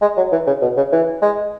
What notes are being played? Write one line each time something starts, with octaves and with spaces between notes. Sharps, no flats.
G#3
F#3
E3
C#3
B2
C#3
E3
G#3